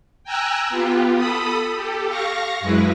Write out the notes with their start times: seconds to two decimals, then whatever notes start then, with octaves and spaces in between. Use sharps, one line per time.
0.24 G5 G#5 A#5 E6 F#6
0.69 B3 F4 G4
1.15 A4 B5 D#6
1.74 G4 A4
2.08 F5 C#6 A#6
2.60 F#2 G#3 E4 B4